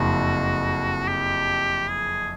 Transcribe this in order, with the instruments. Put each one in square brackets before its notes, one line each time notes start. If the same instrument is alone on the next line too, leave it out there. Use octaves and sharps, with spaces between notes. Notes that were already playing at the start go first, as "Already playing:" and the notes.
Already playing: [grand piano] F#1 F2 [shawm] F#4
[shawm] G4
G#4